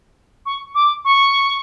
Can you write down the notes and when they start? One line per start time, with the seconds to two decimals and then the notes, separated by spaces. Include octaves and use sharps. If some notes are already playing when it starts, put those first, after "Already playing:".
0.46 C#6
0.75 D6
1.05 C#6